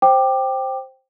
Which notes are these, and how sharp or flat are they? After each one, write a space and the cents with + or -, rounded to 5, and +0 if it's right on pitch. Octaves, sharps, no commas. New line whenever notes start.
C5 +10 G5 +0 D6 +20